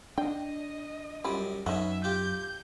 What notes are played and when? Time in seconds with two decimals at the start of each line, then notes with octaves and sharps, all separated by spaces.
0.18 D4 D#5 G5
1.25 F#2 G3 C#4 E4 F4
1.66 F#2 B3 C#4 D#4 E5 F#5
2.04 F4 G4 G6